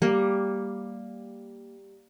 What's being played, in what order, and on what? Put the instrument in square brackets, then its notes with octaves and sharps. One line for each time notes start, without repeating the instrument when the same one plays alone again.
[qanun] G3 A#3